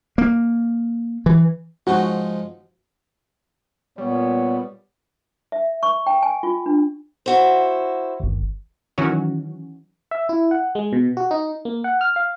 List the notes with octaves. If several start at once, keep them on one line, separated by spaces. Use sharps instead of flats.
A#3
E3
G#2 F3 D#4 F#4
A#2 G3 B3 C#5
E5
C#6
G5
G#5
F4
D4
E4 F#4 C5
G1 D#2
D#3 E3 F#3 C#4 F#4
E5
E4
F#5
G#3
B2
F#4
D#4
A#3
F#5
F6
F5